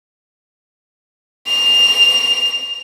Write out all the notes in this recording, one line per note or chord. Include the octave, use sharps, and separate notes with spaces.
F7